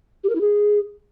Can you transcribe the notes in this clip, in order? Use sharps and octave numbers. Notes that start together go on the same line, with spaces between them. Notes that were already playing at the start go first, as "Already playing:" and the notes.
G4
A#4
E4
G#4